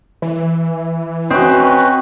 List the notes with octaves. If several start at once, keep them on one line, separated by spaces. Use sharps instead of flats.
E3
C4 C#4 F#4 B4 D#5